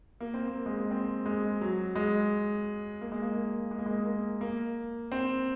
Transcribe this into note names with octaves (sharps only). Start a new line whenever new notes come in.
A#3
C4
A#3
G#3
A#3
C4
G#3
F#3
G#3
A#3
G#3
A#3
A#3
G#3
A#3
G#3
A#3
A#3
C4